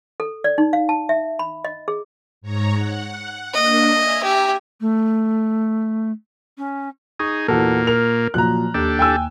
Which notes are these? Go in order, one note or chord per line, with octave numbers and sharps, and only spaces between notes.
A4
D5
D#4
F5
A5
E5
B5
D#5
G#4
G#2 C#5 A#5
F#5
A#3 D4 D#5
E5 G#5 A#5
G4
A3
C#4
D#4 G#4 C#6
E2 A#2 A#3 F#4 A4
A#4 F6 F7
A#2 F3 F#3 A#5 F#6
D#2 D4 G4 A4
G5 G#5 E6